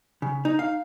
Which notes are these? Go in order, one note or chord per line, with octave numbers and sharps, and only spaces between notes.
C#3
D#4
F5